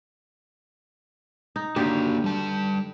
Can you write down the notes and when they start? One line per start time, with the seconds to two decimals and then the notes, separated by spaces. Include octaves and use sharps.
1.56 D#4
1.76 D3 D#3 A#3 F#4 G4
2.24 G3 A5